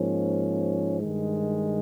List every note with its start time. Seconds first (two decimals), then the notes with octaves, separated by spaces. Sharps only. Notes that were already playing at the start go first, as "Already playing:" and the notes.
Already playing: G#2 F3 A#3 C#4
1.00 G2 D#3 G#3